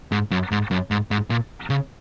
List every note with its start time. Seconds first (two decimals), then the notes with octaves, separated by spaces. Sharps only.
0.12 G#2
0.31 F#2
0.51 G#2
0.71 F#2
0.91 G#2
1.11 G#2
1.30 A#2
1.70 C#3